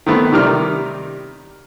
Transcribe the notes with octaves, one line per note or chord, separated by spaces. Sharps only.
D#3 A3 B3 C4
C3 D#3 G3 A#4 F6